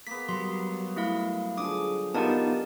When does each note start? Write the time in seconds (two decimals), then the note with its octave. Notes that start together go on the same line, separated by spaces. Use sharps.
0.07 A#3 B3 B6
0.29 F#3 G3 C6
0.96 A3 E4 F5
1.58 D3 F3 G#4 D6 D#6
2.15 B3 D#4 F4 G4 A#4 A5